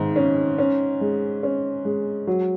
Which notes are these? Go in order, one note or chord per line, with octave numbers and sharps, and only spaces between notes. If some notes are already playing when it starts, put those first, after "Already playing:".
Already playing: G#2 D#3
C#4
C#4
G#3
C#4
G#3
F#3